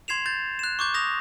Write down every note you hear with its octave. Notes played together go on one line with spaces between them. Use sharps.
C6 G#6 C7 E7 F7
G6 A6
F#6 E7
C#6 D6 G6
D#6 A#6 F7